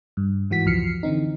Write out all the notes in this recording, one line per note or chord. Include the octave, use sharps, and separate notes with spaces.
G2
G#2 E3 F#4 B6
C#2 F#2 F3 F6 C7 C#7
D3 E3 C4 D#4